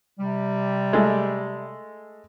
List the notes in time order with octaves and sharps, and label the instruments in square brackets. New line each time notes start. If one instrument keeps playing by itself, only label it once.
[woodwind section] C3 G3
[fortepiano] G#3 A3